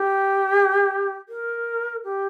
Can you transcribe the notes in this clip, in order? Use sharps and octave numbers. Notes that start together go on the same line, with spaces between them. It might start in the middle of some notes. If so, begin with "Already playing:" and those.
Already playing: G4
A#4
G4